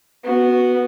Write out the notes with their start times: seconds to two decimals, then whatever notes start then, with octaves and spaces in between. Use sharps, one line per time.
0.24 B3 F#4